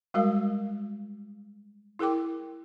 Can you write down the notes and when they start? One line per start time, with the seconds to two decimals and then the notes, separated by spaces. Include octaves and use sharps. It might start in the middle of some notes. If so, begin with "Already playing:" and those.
0.14 G3 G#3 F#4 A#4 F5
1.99 E4 G#4 A#4 G5 D6